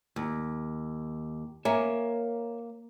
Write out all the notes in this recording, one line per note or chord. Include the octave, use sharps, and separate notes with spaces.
D#2
A#3 C#5 E5 G#5